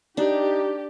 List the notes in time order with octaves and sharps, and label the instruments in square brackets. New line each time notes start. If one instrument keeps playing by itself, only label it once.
[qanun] D4 [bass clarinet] D#4 [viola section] G4